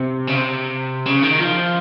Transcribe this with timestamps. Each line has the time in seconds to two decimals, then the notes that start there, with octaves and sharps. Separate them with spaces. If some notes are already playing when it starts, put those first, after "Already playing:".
Already playing: C3
0.28 C#3
0.36 C3
1.06 C#3
1.23 D#3
1.40 F3